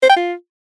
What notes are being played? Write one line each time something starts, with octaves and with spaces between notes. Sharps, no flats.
C5
G5
F4